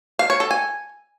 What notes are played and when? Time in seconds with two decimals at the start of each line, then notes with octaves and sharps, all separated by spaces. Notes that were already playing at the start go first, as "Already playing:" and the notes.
0.19 F5
0.30 C#5
0.40 A4
0.51 G#5